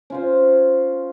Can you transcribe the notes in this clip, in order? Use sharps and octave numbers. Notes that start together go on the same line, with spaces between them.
C#4 F4 C5